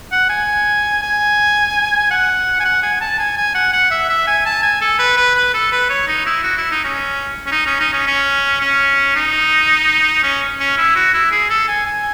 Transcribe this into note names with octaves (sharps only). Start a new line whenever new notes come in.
F#5
G#5
G#5
F#5
G#5
F#5
G#5
A5
G#5
G#5
F#5
F#5
E5
E5
G#5
A5
G#5
A4
B4
B4
B4
A4
B4
C#5
D#4
E4
F#4
E4
D#4
C#4
C#4
D#4
C#4
D#4
C#4
C#4
C#4
D#4
C#4
C#4
E4
F#4
E4
G#4
A4
G#5
G#5